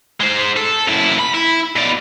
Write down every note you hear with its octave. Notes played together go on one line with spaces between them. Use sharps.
G#3 C5
A4
F#2 E4
B5
E4
B2 D5